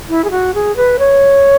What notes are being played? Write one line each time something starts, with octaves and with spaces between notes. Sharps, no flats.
E4
G#4
F#4
G#4
B4
C#5